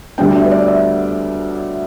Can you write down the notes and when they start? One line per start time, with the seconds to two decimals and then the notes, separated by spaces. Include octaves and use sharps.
0.18 D2 D3 G3 B3 D4 G5
0.35 E5
0.44 B4
0.51 D5
0.68 E5